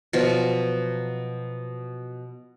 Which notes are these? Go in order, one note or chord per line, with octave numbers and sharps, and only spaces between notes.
B2 F3 F#3